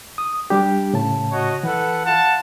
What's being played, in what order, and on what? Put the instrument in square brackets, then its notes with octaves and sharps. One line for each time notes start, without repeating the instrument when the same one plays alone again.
[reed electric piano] D#6
G3 D4 G4
A2 C#3 A5
[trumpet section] F#4 C#5 D#5
[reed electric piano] E3 [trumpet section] A4 B4 F#5
[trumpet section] F4 F#5 A5